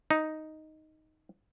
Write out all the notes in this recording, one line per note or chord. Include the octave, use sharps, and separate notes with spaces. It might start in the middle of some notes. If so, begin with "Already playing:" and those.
D#4